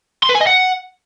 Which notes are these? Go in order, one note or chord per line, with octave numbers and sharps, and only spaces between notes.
C6
B4
G#5
D#5
F#5